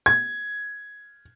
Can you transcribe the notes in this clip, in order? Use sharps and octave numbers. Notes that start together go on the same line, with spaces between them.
G#6